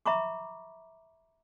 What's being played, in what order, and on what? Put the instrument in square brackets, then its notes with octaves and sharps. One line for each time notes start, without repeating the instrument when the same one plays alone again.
[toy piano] E5 A#5 B5 C#6 D6